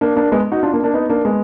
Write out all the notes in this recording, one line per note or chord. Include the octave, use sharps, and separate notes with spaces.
A#3 D4
A#3 D4
G#3 B3
D#4 F#4
D4 F4
A#3 D4
A#3 D4
B3 D#4
A#3 D4
G#3 B3